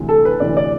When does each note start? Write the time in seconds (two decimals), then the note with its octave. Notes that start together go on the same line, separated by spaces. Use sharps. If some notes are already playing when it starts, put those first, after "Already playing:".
Already playing: D2 C3 E3
0.09 A4
0.25 B4
0.40 D2 C3 E3 D5
0.57 D5